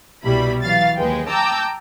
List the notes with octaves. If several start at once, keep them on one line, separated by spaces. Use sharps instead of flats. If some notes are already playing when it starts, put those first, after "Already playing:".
C2 B2 G3 E4 B5
E3 F#3 F5 A6
D#2 G#3 G#4 B4 G5
G5 A5 A#5 D6 E6 G6